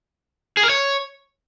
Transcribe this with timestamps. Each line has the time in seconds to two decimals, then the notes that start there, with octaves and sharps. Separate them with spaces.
0.57 G#4
0.63 A#4
0.69 C#5